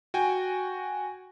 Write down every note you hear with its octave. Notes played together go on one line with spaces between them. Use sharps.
F#4 G5 G#5